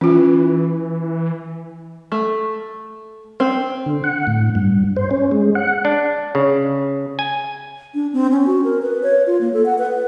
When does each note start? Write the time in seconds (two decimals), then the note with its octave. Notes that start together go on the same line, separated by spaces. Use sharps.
0.01 E3 C#4 F4
2.12 A3
3.40 C4
3.86 D3
4.04 F#5
4.27 A2
4.55 G2
4.96 C5
5.11 C#4
5.31 G#3
5.55 F#5
5.85 D4
6.35 C#3
7.19 G#5
7.94 D4
8.13 C4
8.32 C#4
8.47 F#4
8.64 A#4
8.82 B4
9.03 C#5
9.27 F4
9.41 A#3
9.53 A4
9.66 F#5
9.78 B4